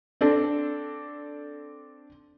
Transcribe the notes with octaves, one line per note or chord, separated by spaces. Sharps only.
C4 D4 A4